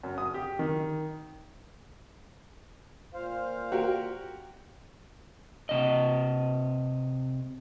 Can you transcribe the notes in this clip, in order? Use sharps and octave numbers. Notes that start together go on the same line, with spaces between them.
F#2
D#6
G4
D#3
A#2 C5 F5
F#4 G4 A#4
C3 D#5